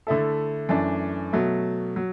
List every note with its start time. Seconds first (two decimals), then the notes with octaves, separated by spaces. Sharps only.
0.07 D3 A3 E4 A4
0.69 F#2 E3 A3 D4
1.33 B2 F#3 A3
1.96 F#3